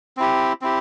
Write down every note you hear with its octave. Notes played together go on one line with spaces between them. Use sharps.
C4 E4 G4
C4 E4 G4